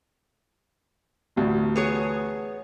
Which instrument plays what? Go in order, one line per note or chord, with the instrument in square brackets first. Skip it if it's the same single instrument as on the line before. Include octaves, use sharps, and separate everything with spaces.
[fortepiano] A1 D2
[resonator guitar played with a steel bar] B3 G#4 C#5